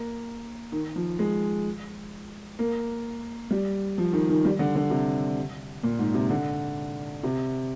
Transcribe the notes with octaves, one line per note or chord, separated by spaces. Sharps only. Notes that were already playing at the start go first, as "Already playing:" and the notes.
Already playing: A#3
D#3
F3
G#3
A#3
G3
F3
D#3
D#3
G3
D3
D3
C3
A#2
G#2
C3
D3
C3